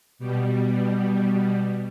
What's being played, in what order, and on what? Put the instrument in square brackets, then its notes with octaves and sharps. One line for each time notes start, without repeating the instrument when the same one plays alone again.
[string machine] B2 G3